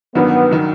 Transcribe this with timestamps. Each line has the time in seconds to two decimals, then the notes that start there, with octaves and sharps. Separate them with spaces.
0.15 A1 G2 D#3 F#3 B3
0.51 D#3 F#3